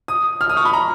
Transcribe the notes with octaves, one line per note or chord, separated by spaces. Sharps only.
D#6
F6
D#6
C#6
B5
A#5